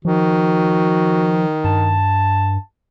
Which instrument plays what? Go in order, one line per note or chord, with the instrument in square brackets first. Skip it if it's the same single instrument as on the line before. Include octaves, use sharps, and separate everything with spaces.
[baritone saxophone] D#3 [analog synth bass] F3 [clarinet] F#4
[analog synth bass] G2 [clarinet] A5